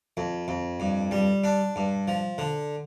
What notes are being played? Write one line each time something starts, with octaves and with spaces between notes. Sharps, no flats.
F2
F2
G2
G3
D4
G2
F3
D3